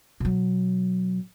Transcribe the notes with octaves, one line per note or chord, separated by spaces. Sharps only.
B2 F#3